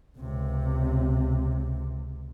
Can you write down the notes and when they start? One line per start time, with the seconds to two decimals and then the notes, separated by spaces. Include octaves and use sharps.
0.17 C#2 C3